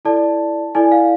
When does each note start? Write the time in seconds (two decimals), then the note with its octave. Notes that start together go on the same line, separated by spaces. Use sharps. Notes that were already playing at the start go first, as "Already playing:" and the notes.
0.05 E4 A4 D5 A5
0.75 E4 A4 D5 G#5
0.92 F5